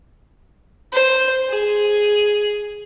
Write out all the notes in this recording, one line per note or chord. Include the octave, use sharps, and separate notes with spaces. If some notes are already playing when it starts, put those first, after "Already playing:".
C5
G#4